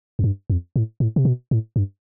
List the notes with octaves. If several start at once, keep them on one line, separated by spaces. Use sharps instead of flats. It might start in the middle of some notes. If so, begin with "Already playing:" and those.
F2
G2
F2
A2
A2
C3
B2
A2
G2